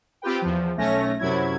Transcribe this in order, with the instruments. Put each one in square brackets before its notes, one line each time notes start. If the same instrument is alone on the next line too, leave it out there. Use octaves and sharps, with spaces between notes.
[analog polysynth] C4 F4 G4 B4 G5
E2 F3
B1 A3 C#4 A#6
F#2 C3 F#3 E4 G#6